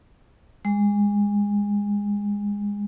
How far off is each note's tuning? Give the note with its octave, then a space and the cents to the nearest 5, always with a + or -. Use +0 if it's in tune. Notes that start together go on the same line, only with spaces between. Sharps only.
G#3 -25